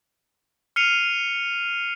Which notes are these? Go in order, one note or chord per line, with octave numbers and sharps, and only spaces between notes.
F6 C7 C#7 D#7 F7